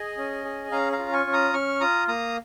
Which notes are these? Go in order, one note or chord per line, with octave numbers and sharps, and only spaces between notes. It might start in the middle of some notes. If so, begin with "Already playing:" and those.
Already playing: G#4 D#5 G#5
C#4
G#4
C#4 F5 A#5
F5 A#5
F4
G#5 C#6
C#4
A#5 D#6
C#4 C#6 F6
F4 A#5 D#6
A#3 A#5 D#6